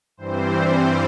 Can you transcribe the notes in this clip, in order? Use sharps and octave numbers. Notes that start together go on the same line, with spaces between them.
G2 E3 G3 C4 C5